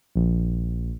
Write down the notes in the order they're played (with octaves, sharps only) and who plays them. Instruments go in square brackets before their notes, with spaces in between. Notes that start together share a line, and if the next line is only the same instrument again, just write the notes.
[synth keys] A#1